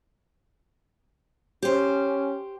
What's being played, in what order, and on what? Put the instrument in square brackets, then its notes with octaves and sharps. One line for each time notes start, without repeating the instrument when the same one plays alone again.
[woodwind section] C#4 [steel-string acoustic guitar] G4 C5